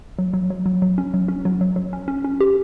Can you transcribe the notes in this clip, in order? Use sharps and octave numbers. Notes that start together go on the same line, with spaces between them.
F#3
F#3
F#3
F#3
F#3
C#4
F#3
C#4
F#3
F#3
F#3
C#4
C#4
C#4
G4